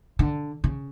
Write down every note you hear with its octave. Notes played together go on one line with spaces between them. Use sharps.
D3
C#3